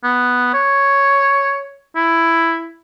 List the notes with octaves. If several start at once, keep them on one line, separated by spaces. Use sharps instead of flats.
B3
C#5
E4